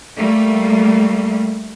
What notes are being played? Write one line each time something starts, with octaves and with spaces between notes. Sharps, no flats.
G3 A3 A#3